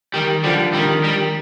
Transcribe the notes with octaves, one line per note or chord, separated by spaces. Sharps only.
D#3 G3
D3 F3 G3
D#3 G3
G3